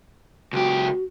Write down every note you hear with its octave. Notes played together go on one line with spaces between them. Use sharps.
C#2 F#4 G4